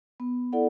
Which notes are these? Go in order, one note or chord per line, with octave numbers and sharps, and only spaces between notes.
B3
E4 A4 D5 F#5